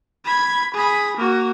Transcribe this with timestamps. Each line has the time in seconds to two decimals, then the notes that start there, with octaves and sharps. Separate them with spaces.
0.25 B5 G#6
0.74 G#4 B5
1.17 A#3 F#4